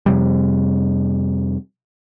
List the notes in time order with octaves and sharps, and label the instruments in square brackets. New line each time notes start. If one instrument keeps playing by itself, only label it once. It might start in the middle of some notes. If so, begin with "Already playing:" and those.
[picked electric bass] F2 C3 G3